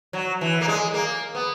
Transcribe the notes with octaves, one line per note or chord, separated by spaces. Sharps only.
F#3
E3
A#3
G#3
A#3
B3